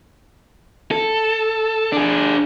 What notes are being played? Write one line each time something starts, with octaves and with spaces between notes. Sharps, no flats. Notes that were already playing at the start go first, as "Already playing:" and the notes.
A4
D4 G#4